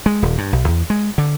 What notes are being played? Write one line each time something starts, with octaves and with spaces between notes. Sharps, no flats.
G#3
D#1
G2
B1
E2
G#3
D3